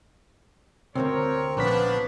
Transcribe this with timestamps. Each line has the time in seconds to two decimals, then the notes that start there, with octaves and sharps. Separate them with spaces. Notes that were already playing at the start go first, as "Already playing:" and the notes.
0.95 D2 A2 C3 C4 A#4 C#5 A#5
1.57 A#1 F3 B3 C#4 D4 B4 B6